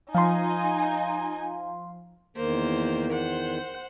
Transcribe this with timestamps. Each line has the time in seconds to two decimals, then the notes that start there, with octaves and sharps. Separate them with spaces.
0.15 F3 D#4 F5 G#5 C6
2.37 E2 D#3 A#3 C5
3.13 C5 F#5